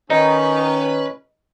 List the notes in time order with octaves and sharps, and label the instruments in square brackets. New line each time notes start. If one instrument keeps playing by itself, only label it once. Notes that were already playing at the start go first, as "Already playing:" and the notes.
[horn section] D#3 [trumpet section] C#4 [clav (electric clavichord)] D#4 [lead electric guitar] B4